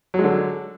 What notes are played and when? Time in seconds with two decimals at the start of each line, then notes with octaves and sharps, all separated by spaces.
0.14 F#3
0.19 G#3
0.24 D3